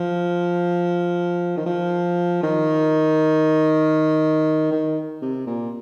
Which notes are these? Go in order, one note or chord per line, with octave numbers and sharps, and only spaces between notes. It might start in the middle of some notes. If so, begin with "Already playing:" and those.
Already playing: F3
D#3
F3
D#3
D#3
C3
A#2